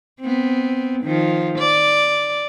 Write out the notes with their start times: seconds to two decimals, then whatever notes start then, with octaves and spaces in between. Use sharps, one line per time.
0.21 B3 C4
1.04 D#3 F3
1.58 D5